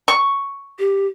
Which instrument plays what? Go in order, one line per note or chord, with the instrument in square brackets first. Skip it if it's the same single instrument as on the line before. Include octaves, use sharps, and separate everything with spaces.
[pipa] C#6
[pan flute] G4